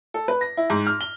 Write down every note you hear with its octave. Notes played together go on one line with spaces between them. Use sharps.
A4
B4
A#6
E4
G#2
F6
G7